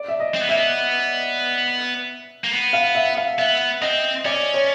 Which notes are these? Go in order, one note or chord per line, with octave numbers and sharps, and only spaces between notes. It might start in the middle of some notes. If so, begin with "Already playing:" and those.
Already playing: D5
E5
D#5
C4
B3
A#3 E5
B3
A#3
B3
F5
E5
F5
B3 E5
C4 D#5
C#4 D5
C#5